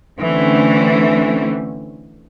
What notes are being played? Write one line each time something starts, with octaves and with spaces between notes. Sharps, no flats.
D3 E3 A3 C4 C#4